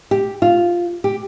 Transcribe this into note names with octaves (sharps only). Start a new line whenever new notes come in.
G4
F4
G4